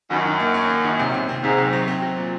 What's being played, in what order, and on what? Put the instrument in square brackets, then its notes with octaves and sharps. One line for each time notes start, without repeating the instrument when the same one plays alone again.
[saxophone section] F#2 [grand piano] D#3
[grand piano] D#3
A#3
C#4
A#3
D#3
C3
C3
C4
[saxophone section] G#2 [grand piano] C3
[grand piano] F#3
F#3
C4
F#3
A#2